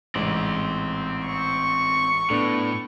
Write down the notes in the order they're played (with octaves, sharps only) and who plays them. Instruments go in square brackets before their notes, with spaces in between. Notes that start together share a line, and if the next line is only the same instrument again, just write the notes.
[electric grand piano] A1 G#2 [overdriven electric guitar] C4 D5
[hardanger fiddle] C#6
[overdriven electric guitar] A2 [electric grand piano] B3 D4 A4